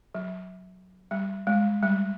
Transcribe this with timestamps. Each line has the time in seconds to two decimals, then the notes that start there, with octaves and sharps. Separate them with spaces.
0.15 F#3
1.11 G3
1.47 G#3
1.83 G3